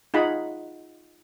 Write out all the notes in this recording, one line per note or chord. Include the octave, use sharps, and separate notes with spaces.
D#4 F4 G#4 F#5 B5